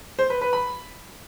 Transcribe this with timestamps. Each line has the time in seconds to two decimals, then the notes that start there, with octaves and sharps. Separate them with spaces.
0.19 C5
0.30 B4
0.41 B4
0.53 B5